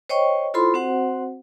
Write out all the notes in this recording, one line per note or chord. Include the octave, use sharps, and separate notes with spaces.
C5 C#5 D#5 G5 C#6
E4 F4 A4 C5 B5 C6
C4 F#4 C5 F#5